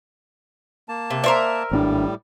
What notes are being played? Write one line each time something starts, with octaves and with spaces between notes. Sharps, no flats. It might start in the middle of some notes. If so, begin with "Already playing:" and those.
A#3 A5
C3
A#4 C5 D5 E5
G#1 A2 G3 C4 D4